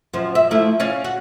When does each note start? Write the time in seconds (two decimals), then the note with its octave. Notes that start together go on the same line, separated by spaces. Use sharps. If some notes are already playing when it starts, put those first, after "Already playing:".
0.13 F#2 F3
0.35 E5
0.51 F3 A3 E4
0.80 C#4 D5 F5
1.04 F#4